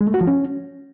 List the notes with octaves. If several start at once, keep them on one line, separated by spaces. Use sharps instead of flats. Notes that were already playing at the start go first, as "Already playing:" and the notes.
G#3
A3
F#4
F3
C#4